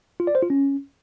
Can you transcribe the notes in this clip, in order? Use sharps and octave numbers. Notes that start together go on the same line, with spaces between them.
F4
D5
C5
F4
C#4